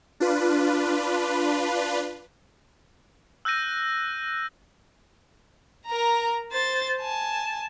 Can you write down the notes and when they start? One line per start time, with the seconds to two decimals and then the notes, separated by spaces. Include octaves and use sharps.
0.20 D4 F4 B4
3.45 E6 F#6 G6 A#6 D#7
5.86 A#4 A#5
6.52 C5 A6
7.00 G#5 A5